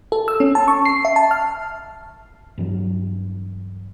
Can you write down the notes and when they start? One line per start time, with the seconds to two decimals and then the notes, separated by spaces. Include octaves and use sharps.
0.12 A4
0.28 E6
0.40 C#4
0.55 A5
0.68 C#6
0.85 C7
1.05 E5
1.16 A5
1.31 F6
2.58 G2 E3 F#3